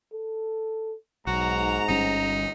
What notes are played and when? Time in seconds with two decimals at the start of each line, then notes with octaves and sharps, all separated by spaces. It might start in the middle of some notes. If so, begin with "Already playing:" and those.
0.14 A4
1.27 B1 G#2 F#4 A#5
1.89 G1 G3 C#4 D#4